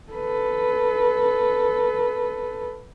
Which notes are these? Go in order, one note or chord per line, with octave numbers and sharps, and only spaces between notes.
A4 B4